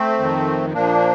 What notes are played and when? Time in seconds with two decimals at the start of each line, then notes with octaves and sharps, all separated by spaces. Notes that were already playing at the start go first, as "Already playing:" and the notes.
Already playing: A3 C4
0.19 F2 D#3
0.73 A#2 F3 A#3 D4